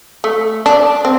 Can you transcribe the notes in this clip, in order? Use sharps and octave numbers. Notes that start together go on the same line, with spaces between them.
A3
D4
C4